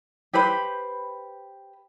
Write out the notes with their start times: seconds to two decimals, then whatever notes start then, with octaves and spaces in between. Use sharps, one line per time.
0.33 G4 B4 C5 B5